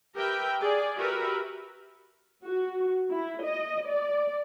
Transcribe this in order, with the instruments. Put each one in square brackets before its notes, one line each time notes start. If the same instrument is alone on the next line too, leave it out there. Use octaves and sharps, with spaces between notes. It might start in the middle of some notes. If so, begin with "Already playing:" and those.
[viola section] G4 A#4 B4 E5 G5
G#4 D5
F#4 G4 A#4 B4 E5
F#4
E4
D#5
D5